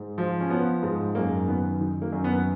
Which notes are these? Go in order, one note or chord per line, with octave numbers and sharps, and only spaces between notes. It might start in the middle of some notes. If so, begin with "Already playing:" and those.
Already playing: G#2
F3
C#4
F3 B3
G#2
F#2 A#3
D#3 B3
D#3
A#3
F#2
B3